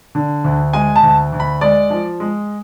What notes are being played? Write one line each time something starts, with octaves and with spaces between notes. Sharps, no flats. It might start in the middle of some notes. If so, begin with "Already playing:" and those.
D3
D2
G#3 G#5
A5
D2
D2
B5
G#3 D5
F3
G#3